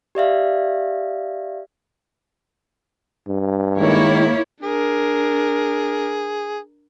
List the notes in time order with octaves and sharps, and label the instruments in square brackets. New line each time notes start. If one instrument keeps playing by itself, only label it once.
[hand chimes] G4 D5 E5 F5
[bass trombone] G2
[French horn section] D#3 G#3 [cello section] A#3 E4 C#5
[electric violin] D4 A#4 [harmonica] G#4